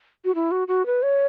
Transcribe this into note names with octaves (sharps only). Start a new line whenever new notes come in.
F#4
E4
F#4
F#4
B4
C#5